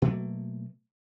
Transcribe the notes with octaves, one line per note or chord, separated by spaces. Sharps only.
B2 F#3 A3 A#3